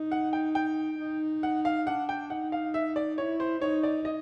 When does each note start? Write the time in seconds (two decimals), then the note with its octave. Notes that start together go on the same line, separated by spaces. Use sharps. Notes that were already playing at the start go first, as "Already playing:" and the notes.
Already playing: D#4
0.11 F#5
0.33 G5
0.55 G5
0.99 D#4
1.43 F#5
1.65 F5
1.86 D4 F#5
2.09 G5
2.30 D#4 F#5
2.52 F5
2.74 E5
2.96 D5
3.18 E4 C#5
3.40 C5
3.62 D#4 C#5
3.83 D5
4.05 D#5